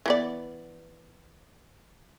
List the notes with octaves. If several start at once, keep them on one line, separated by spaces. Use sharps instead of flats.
E3 B3 D5